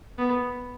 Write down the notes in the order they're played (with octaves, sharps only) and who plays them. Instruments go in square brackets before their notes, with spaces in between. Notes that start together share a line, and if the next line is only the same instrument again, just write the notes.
[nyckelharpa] B3